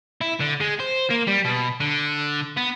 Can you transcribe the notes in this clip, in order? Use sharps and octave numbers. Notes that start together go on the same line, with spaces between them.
E4
D3
G#3
C5
A#3
G3
B2
D3
B3